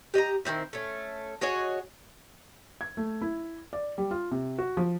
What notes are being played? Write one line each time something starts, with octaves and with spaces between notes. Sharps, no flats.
G4 D#5 G5 A#5
D#3 F3 C4 E4
A3 C#4
F#4 G#4 C#5 D#5
G#6
A3
E4
D5
G3
F4
C3
F#4
F3